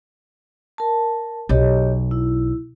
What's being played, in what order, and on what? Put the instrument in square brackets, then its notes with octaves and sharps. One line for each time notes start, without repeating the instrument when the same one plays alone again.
[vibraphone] A#4 A5
[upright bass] B1 [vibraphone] G4 C#5 D#5
[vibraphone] E4